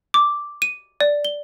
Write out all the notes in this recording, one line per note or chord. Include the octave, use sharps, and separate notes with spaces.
D6
D#7
D5
G7